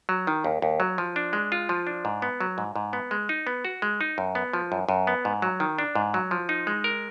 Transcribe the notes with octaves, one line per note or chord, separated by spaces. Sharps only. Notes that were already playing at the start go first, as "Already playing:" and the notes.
F#3
D#3
D#2
D#2
F#3
F3
D4
G#3
F4
F3
D4
G#2
B3
F#3
G#2
G#2
B3
G#3
D#4
B3
F#4
G#3
D#4
F#2
B3
F3
F#2
F#2
B3
G#2
F#3
D#3
D4
G#2
F#3
F3
D#4
G#3
A#4